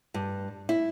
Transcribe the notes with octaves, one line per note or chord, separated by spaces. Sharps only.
G2
E4